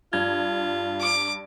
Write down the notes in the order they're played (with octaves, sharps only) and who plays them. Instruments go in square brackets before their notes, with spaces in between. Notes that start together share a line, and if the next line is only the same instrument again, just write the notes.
[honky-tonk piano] G2 G#6 [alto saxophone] F4
[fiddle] D6